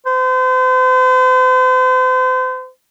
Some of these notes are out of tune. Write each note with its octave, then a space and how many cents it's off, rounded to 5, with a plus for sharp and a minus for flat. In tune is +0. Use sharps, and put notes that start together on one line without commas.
C5 -40